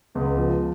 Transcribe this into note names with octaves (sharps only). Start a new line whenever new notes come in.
C#2 B3
F3